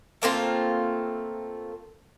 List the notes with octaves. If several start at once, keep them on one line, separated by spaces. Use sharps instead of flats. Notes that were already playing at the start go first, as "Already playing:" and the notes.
A3 A#3 C4 F4